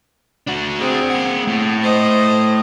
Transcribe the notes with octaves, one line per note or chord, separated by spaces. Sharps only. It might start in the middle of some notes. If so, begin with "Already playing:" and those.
D4 F#4
C4 G#4
A#3 F#5
A2
C5 D#5